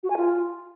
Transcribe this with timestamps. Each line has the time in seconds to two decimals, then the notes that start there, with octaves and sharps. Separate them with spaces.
0.03 F#4
0.10 G#5
0.17 F4